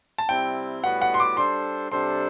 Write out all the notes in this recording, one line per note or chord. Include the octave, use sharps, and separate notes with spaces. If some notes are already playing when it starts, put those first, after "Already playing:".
A5
C3 G3 C4 E4 G5
A2 G3 B3 F#4 B4 F#5
F#5
C6
D6
G3 D4 A4 C5 C6
C3 G3 D4 A4 C5 C6